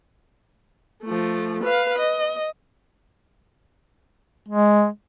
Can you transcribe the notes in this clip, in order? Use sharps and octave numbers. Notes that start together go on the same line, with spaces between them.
F3 A3
B4 F5
D#5
G#3